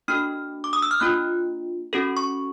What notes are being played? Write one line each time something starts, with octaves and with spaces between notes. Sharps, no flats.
A#3 D4 F#4 A4 F6
D6
D#6
E6
F6
A#3 D4 F4 F#6
C#4 F#4 A4
C#6